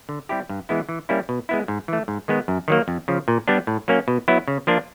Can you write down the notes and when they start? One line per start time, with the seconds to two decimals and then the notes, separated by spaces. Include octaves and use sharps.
0.09 D3
0.29 G3 C4 E4 G4
0.49 G2
0.69 E3 G#3 B3 E4
0.89 E3
1.09 G3 A#3 C#4 E4
1.29 B2
1.49 G#3 B3 E4
1.68 G#2
1.88 E3 A3
2.08 G#2
2.28 D#3 G#3 B3
2.48 F#2
2.68 D#3 F#3 A#3
2.88 F2
3.08 C#3 F3
3.28 A#2
3.48 G3 B3 D4
3.67 A2
3.88 F#3 A#3 C#4
4.08 B2
4.28 F#3 B3 E4
4.48 C#3
4.67 F3 A#3 D4 F4